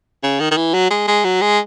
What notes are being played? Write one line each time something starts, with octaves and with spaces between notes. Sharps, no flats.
C#3
D#3
D#3
E3
F#3
G#3
G#3
F#3
G#3